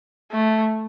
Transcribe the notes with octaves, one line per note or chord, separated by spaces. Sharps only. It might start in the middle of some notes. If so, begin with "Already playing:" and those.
A3